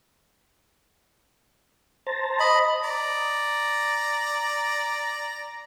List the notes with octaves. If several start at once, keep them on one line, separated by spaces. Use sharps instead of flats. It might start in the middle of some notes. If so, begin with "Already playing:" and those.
C5 A5 A#5
D#5 B5
D5 A#5